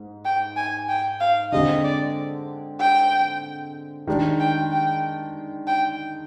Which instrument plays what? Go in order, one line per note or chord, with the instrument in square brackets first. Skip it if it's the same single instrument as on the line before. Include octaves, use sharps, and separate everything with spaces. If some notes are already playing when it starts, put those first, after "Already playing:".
Already playing: [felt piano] G#2
[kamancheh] G5
G#5
G5
F5
[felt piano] D3 G#3 C4 [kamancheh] D#5
[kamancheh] D5
G5
[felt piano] D#3 G#3 D4
[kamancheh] G5
G5
G5